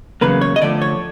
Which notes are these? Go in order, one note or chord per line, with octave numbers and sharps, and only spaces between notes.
E2 C#3 F#3 A#3 B4
C#5
D#5
D3 F3 A3 D5
C#5